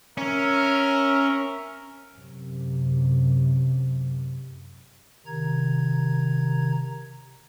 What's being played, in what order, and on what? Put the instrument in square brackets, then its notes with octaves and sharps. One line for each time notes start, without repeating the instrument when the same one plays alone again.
[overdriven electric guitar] C#4 [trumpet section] A#4 E5
[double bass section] F#2 C3
[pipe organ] C3 D#3 A#5 G#6